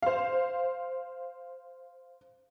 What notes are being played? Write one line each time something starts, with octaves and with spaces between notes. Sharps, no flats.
C5 F5